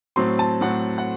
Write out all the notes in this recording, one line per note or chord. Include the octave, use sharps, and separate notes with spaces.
A2 F#3 C4 C6
A5
A2 F#3 C4 F#5
F#5